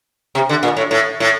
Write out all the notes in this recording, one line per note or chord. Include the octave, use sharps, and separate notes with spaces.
C3
D3
A#2
A2
A2
A2